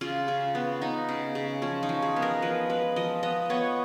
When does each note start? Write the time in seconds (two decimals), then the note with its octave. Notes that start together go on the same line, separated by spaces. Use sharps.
0.01 C#3 F4
0.28 C#3
0.55 B3
0.82 B3 D#4
1.09 C#3
1.35 C#3
1.62 F3 C#4
1.83 D#4
1.89 F3
2.02 G#4
2.16 B3
2.22 A#4
2.42 F3 B4
2.69 G#3 B4
2.96 F3 D#5
3.23 B3 D#5
3.50 B3 C#5